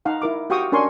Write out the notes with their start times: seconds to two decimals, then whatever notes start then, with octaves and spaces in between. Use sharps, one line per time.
0.05 D#4 F5 F#5
0.22 E4 A#4 D6
0.50 F#4 G4 F5 G5 C#6 D#6
0.72 C#4 D4 A#4 G#5 C6 C#6